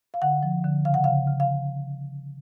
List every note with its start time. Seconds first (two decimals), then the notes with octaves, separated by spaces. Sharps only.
0.14 F5
0.22 D3 F#5
0.43 F3
0.64 D3
0.85 C#3 F5
0.94 F#5
1.04 C#3 F5
1.28 C#3
1.40 F5